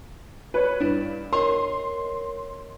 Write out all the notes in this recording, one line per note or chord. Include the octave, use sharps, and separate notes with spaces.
B4 C#5
G2 D4 E4
A#4 C#5 D#5 C6